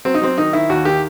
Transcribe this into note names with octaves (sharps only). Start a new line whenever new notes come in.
F#3 C4
D#4
F#3 C4
D#3 D#4
D#3 E4
D#2 F#4
D#3 G4